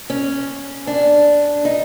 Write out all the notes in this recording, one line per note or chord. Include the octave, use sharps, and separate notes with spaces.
C#4
D4
D#4